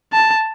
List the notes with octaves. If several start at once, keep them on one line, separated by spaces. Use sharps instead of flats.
A5